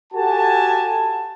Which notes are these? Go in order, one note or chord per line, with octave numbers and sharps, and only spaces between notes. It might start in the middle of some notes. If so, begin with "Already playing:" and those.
F#4 G4 A4 G#5 A5